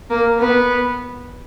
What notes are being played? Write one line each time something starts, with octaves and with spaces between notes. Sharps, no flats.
A#3
B3